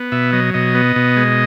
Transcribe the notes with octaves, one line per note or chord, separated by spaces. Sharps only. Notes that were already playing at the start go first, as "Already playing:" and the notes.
Already playing: B3
B2 E5
F#3 D#5
B2 D#5
B3
B2
G#3